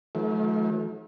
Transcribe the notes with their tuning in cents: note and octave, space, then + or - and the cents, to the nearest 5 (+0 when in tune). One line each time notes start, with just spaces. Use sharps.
D#3 +35 F#3 -45 A3 -35